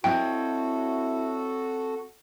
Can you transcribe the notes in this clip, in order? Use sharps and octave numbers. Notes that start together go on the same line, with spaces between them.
C4 E4 F#4 A4 C#5 D#5 G5